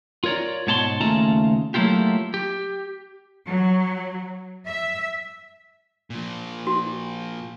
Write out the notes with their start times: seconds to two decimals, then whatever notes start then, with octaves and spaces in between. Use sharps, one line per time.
0.24 F4 A#4 C#5 D5 A#5
0.67 G#2 B2 C#5 A5 B5 C6
1.01 D#2 C#3 A3 F4 A5 A#5
1.74 F#3 A3 A#3 E4 F4 G4
2.34 G4
3.48 F#3
4.66 E5
6.10 A#2 F3
6.67 F#4